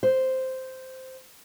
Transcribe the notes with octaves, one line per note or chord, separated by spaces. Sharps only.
C5